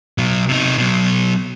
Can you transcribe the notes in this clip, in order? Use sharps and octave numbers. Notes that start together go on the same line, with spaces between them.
B2 F#3
C3 D#4
B2 F#3